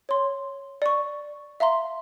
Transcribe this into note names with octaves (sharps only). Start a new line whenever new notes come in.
C#5 C6
D5 C#6
E5 F5 A#5 C6